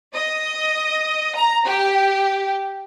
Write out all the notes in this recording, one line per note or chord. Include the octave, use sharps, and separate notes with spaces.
D#5
A#5
G4